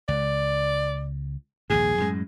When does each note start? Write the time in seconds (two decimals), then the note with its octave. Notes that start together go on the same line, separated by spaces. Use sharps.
0.08 C#2 D5
1.70 A#1 D#2 G#2 G#4
1.98 F#2 A2 G#3